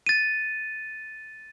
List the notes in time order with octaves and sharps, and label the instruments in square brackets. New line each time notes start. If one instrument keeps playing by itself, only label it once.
[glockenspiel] A6 D#7